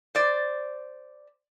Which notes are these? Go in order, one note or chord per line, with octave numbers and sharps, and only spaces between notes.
C5 D5